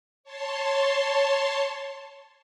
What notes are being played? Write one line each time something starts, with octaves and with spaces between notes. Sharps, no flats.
C#5 A5 C6